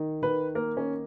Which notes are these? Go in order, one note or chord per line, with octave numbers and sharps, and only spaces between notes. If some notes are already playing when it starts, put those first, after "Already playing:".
Already playing: D#3 D#4
D#3 B4
A#3 A#4
C#4